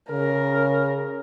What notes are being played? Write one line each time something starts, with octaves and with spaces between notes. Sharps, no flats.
C#3 A#4